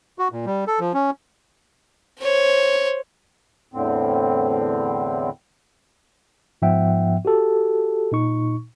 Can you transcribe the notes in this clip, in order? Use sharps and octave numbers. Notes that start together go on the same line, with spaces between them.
F#4
A#2
G3
A4
F3
C#4
C5 C#5
E2 A2 D3 C4
G#2 F3 B3 E5 F#5 G5
F#4 G4 A4
A#2 D#4 C#6